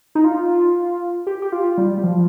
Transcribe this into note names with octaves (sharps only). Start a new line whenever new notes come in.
D#4
F4
G4
G4
F4
G3
G3
F3